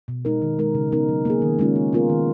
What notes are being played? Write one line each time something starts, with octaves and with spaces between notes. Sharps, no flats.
B2
G#3 D#4 A#4
D#3
G#3 D#4 A#4
C#3
G#3 B3 D#4 A#4
F#3
A#3 C#4 G#4
D#3
G#3 C#4 F4
G#3
B3 F4 A#4
D#3